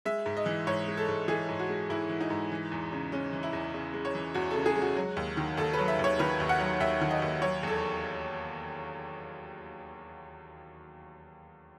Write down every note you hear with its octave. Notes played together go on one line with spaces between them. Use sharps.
G#3 E5
G#2
D#5
E3
G#2 C#5
G#3
A4
G#2
E3 G#4
G#2
F#4
G#3
G#2 E4
E3
D#4
G#2
E3
E2
C#3
G#3 C#4
E3
E4
E2
C#3
G#3
C#5
E3
E2 F#4
C#3 A4
G#4
G#3
F#4
F#3
D#2
D#3
D#2 A4
B4
F#3
E5
D#2
C#5
D#3 B4
D#2
F#5
F#3
D#2 E5
D#3
D#5
D#2
F#3 C#5
E2 A4